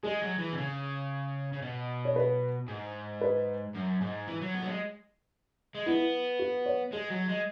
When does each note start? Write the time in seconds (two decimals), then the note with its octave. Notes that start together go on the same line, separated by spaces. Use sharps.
0.03 G#3 G#4
0.22 F#3
0.38 E3
0.53 B2
0.57 C#3
1.53 C#3
1.62 B2
2.05 C#5
2.16 B4
2.68 G#2
3.21 B4
3.75 F#2
4.01 G#2
4.27 E3
4.41 F#3
4.54 B3
4.62 F#3
4.67 G#3
5.75 G#3
5.86 B3 E4
6.39 F#4
6.66 C#5
6.92 G#3 G#4
7.10 F#3
7.29 G#3